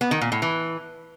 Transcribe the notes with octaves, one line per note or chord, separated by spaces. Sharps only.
B3
D#3
A#2
A2
E3